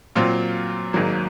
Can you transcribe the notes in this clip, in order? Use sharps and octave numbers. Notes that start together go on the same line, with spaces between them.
A#2 F#3 C4 F4
G#1 G#2 F#3 A#3